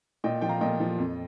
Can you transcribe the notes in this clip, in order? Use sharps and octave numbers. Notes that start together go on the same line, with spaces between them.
A#2 D#5 G5
F3 G5
F5 A#5
A#2 D#5 G5
F3
F2